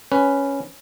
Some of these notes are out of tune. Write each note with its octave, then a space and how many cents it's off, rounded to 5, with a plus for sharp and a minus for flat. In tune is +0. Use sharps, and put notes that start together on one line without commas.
C#4 +0 B4 +0